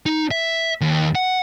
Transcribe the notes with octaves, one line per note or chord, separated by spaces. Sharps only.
D#4
E5
D#2
F#5